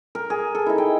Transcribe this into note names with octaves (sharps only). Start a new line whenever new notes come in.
A#4
G#4
A4
D#4 E4
G5